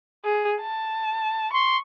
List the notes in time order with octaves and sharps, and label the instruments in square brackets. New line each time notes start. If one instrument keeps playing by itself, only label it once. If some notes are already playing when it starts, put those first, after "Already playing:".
[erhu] G#4
A5
[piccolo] C6 [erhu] C#6